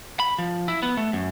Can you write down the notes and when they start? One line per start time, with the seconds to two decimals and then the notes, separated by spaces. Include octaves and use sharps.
0.20 B5
0.39 F3
0.68 E4
0.83 B3
0.97 A3
1.13 F#2